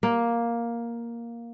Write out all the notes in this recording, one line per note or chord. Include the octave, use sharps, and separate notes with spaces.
A#3